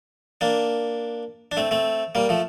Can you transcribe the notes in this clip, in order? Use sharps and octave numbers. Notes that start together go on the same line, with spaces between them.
A#3 D4
D4
A3 C4
A3 C4
G3 A#3
F3 A3